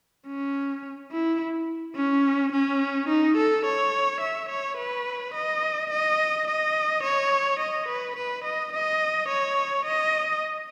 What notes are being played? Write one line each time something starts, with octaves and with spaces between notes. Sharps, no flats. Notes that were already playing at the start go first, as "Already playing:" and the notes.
C#4
E4
C#4
C#4
D#4
A4
C#5
E5
C#5
B4
D#5
D#5
D#5
C#5
D#5
B4
B4
D#5
D#5
C#5
D#5